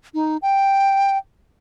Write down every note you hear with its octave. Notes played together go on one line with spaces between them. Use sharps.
D#4
G5